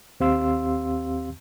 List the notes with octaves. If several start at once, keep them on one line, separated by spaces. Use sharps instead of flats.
D#2 C4 G4 F5 C6 E6